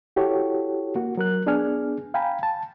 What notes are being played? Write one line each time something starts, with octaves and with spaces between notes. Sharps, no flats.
E4 F#4 G4 A4 C#5
A#3 F#4
F#3 A#4 F#6
B3 D4 G#4 D5 G#5 F6
F5 G5 G#5 A#5 B5
A5